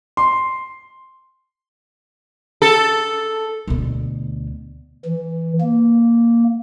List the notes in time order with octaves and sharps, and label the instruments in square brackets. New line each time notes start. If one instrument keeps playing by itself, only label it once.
[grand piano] C6
[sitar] A4
[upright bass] D2 B2
[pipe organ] E3
A#3